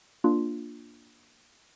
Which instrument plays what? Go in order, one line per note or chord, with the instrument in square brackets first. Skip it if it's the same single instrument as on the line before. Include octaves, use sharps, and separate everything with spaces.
[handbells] A#3 D4 F4